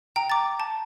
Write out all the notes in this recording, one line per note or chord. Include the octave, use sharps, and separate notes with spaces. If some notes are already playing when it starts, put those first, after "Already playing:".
G5 A#5
D6 A6
A5